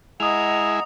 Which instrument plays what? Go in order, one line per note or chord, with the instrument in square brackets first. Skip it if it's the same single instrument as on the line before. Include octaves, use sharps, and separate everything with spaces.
[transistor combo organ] G#3 E4 [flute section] D#5 F#5 A#5 [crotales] D#6 F7